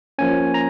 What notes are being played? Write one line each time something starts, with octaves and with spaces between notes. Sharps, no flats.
F3 A#3 C#4 G#5
A#5